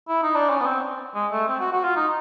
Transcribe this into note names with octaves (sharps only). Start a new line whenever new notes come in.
E4
D#4
D4
C#4
B3
C4
G#3
A3
C4
F#4
F#4
F4
D#4